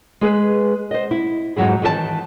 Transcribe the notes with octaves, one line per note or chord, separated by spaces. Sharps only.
G#3 G#4 B4
C5 D#5
E4
F2 G#2 C3 F#3 E4 G#4
D#3 E3 G#4 A5